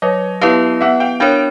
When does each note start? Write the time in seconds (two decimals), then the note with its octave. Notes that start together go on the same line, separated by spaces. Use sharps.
0.02 F#3 C#5 D#5
0.41 B3 E4 G4 B4 D#5 F5
0.81 B3 E5 F#5
1.00 F5 G5
1.20 D4 F#4 A#4 C#5 F5 G5